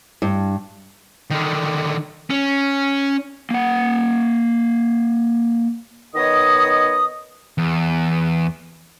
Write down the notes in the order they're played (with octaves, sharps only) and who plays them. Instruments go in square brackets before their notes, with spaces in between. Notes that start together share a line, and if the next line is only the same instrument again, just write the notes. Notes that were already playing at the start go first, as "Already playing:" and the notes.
[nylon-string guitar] G2
[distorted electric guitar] D3 D#3
C#4
[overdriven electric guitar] A#3 F#5
[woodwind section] D#3 B3 C#5 D#5 D#6
[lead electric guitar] E2